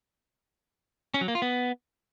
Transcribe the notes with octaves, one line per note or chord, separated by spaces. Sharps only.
C#4
F#3
A#3
F4
B3